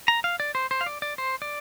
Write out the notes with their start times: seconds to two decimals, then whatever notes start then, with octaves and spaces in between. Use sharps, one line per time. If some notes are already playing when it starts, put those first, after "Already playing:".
0.08 A#5
0.24 F5
0.40 D5
0.55 C5
0.71 C5
0.81 F5
0.87 D5
1.02 D5
1.18 C5
1.42 D5